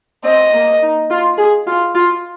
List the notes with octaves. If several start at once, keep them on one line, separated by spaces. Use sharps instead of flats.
C4 D#5
A#3
D#4
F4
G#4
F4
F4